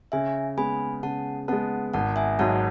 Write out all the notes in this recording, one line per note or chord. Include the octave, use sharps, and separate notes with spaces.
C#3 E5 G#5
G#3 B3 G#5 B5
C#3 F#5 A5
G#3 B3 F#5 A5
G#1 F#5 A5
E5 G#5
G#2 F#3 F#5 A5